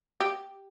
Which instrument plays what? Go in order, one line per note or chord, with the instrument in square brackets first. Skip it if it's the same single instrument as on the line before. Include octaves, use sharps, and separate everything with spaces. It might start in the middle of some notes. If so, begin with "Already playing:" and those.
[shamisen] G4